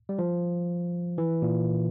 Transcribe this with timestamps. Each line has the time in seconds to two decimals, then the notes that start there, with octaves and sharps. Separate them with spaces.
0.09 G3
0.19 F3
1.18 E3
1.42 A#2